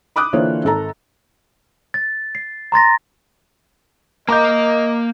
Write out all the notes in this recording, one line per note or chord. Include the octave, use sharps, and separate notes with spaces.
B5 D6 D#6 F#6
D3 E3 A#3 F4 C5 C#5
G#1 A4 A#5
A6
C7
A#5 C6 A6 A#6
A#3 A#4 D#5 A#5 D6 G6